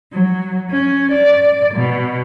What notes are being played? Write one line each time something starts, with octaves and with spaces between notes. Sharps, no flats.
F#3
C#4
D5
B2